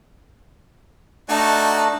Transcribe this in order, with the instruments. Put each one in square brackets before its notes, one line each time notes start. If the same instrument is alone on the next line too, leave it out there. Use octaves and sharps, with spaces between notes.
[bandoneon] A3 D4 [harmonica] D#4 F#4 A5